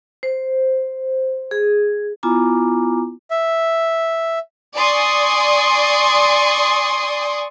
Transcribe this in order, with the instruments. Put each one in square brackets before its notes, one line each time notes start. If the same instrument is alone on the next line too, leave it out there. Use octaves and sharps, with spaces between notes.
[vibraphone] C5
G#4
B3 E4 F4 G#5 A#5 D6
[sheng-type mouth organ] E5
[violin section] D5 G#5 C6 C#6 D#6